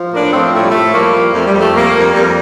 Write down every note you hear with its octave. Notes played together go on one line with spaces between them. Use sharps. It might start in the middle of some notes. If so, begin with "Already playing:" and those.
Already playing: F3
A2 A#3 D4
F3 A3 C4
A2 A3
G3
A2 A3
F3 G3 A#3
F3
F2 A3
G3
F2 A3
F2 G3 A#3
F2
F2 G3 A#3